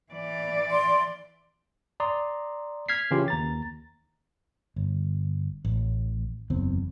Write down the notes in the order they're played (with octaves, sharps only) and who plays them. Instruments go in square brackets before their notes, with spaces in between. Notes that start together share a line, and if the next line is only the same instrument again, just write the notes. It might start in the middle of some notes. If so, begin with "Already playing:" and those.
[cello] E3 D5
[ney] C6
[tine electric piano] D5 A#5 C6 D#6
F6 G#6 B6 C7
C#3 E3 C#4 F4 G4
D#2 A#5 A6
[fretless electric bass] G1
A1
F#1 E2 C4